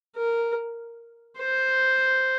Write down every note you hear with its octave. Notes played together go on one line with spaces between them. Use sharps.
A#4
C5